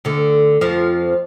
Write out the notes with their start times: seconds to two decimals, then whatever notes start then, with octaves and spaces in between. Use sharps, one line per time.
0.05 D2 D3
0.61 F2 F3